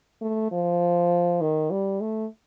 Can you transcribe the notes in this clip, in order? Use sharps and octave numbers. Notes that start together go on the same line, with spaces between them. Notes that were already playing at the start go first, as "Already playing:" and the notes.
A3
F3
D#3
G3
A3